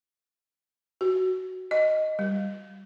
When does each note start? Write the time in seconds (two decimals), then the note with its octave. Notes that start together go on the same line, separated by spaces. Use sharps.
1.01 F#4
1.71 D#5
2.19 G3